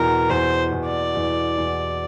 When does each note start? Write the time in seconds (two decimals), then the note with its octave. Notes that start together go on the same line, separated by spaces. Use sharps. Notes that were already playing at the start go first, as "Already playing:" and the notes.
Already playing: E2 B2 A#4
0.29 E2 C5
0.72 E2
0.87 D5
1.15 E2
1.58 E2